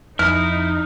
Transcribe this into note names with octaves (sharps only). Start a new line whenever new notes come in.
F2 D#4 E4 F6